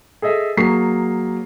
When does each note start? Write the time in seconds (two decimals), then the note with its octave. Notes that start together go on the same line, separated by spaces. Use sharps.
0.22 G#4 A4 D#5 E5
0.57 F#3 A#3 G#4 A5 C#6 C7